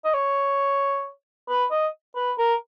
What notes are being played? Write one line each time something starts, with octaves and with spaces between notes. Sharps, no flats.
D#5
C#5
B4
D#5
B4
A#4